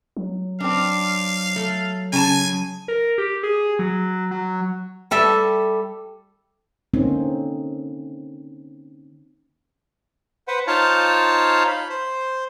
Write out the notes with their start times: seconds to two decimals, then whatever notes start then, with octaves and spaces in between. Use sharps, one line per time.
0.17 F#3
0.61 C4 D4 F5
1.56 A3
2.13 C#3 G#5 A5
2.88 A#4
3.18 G4
3.43 G#4
3.79 F#3
4.31 F#3
5.11 G3 A4 E5
6.94 D3 A#3 C4 C#4 D#4
10.48 B4 C5 F#5
10.67 D#4 F4 C5 C#5 F5 A5
11.67 B5
11.90 C5